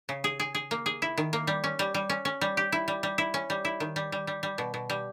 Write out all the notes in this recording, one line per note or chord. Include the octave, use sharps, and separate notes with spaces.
C#3
G#4
G#4
G#4
A#3
G#4
E4
D#3
A#3
G3
C#4
G3
G3
C#4
C#4
G3
G4
E4
G3
G3
E4
C#4
G3
E4
D#3
G3
G3
G3
G3
B2
B2
G3